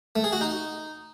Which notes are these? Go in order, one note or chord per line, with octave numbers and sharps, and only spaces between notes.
A3
G#4
F#4
D#4